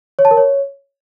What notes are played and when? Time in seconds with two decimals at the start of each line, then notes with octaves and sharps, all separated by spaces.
0.19 C#5
0.25 A5
0.31 A#4
0.37 C#5